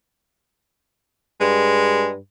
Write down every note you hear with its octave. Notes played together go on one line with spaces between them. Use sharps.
G2 G#3